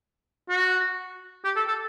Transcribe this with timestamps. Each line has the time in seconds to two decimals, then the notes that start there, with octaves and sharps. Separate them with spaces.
0.49 F#4
1.45 G4
1.56 A4
1.68 A4